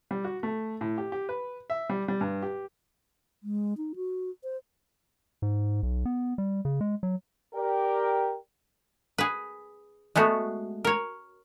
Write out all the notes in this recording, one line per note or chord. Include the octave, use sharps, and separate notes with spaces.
G3
F#4
A3
A2
G4
G4
B4
E5
G3
G3
G2
G4
G#3
D#4
F#4
C5
G#2
B1
B3
G3
C#3
G#3
F#3
G4 A#4 D5 G5
G#4 B4
G#3 A3 B3 F#4
A#4 C#5